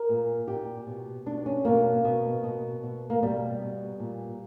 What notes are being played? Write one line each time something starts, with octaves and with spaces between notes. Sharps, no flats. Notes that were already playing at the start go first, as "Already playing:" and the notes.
Already playing: A#4
A#2
A#2 G4
B2
B2 D4
C#4
B2 A#3
B2
B2
B2
A#3
B2 G3
B2
A#2